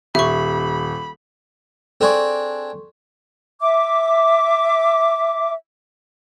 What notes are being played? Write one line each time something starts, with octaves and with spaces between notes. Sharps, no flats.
D#1 G4 E5 B5 C#6
C4 D4 G#4 A4 C6 C#6
E5 D6